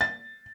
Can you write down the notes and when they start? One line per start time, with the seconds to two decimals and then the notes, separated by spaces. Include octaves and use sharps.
0.01 A6